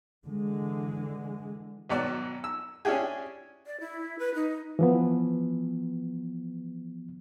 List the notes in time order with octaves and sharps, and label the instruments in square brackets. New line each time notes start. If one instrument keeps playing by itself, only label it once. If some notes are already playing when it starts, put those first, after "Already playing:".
[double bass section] D3 E3 G#3
[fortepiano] G#1 B2 F#3 D5
E6
C#4 D4 E4 G4 G#4
[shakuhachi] D5
E4
B4
D#4
[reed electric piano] E3 F3 B3